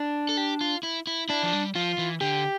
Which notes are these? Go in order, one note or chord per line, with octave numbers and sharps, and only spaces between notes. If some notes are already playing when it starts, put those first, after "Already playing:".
Already playing: D4
A4
G4
F4
E4
E4
D4 E4
F3
G3
F3 F4
E3
D3 G4